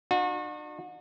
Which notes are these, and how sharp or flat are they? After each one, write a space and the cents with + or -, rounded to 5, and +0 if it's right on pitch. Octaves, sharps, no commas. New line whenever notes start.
D4 +45 F#4 -35